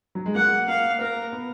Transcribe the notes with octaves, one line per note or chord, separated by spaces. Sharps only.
F#3
G#3
A#3 F#5
A#3 F5
A#3 A#4
B3